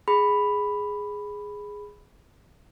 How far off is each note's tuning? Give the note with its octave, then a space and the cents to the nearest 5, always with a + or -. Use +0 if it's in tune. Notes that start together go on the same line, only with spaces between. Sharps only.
G#4 +0 B5 +5